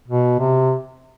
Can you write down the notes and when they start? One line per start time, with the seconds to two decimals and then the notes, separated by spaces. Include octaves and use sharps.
0.08 B2
0.39 C3